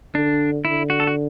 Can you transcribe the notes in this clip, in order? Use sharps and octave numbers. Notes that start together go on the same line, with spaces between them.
D3 D4
D3 E4
F#4
A4
F#4